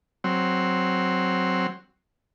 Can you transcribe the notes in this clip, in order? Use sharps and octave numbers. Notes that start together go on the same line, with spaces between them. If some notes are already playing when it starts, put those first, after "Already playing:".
F#3 C4